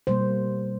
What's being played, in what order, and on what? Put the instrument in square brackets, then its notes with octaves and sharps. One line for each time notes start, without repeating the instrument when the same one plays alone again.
[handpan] B2 G3 A#3 C5